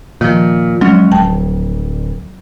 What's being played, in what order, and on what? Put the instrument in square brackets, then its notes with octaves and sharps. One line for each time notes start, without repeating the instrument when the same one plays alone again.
[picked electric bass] A#2 [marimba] D#3 F3
[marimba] F#3 [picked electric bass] G#3 C#4
[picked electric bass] D1 [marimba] G5 A5